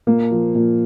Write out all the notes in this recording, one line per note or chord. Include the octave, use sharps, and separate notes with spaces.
A#2 A#3
F3
A#2